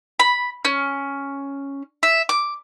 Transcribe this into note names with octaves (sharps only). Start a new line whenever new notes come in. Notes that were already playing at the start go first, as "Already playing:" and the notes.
B5
C#4
E5
D6